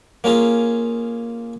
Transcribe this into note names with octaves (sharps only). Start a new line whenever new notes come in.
A#3 C#4 F4 G#4